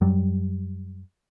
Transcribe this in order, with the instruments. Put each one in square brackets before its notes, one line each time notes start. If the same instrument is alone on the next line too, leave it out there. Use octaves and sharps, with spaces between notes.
[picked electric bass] F#2 F#3 G3